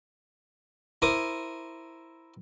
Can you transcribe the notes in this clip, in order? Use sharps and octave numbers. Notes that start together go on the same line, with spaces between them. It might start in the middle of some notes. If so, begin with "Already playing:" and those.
E4 A#4 C5 D6 D#6